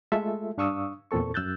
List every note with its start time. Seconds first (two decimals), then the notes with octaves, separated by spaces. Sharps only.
0.12 G#3 A3 F4 A4 E5
0.58 G2 D4 F5 C#6 D#6 E6
1.11 E2 A#2 C4 A4 C#6
1.34 F#2 E6 F#6 G6 A6